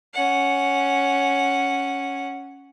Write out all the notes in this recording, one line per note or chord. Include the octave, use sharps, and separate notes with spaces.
C#4 F#5